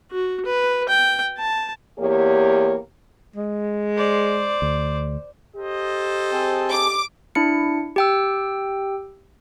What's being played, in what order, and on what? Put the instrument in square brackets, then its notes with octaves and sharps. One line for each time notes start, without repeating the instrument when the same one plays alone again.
[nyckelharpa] F#4
B4
G5
A5
[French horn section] E2 A#3 G4 C#5
[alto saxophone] G#3
[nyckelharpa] C5 D5
[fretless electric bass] D2
[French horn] G4 [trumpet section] A4 C5 D#5
[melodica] C4 G#4 A5
[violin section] D6
[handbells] D4 E4 C#7
G4 G5 E6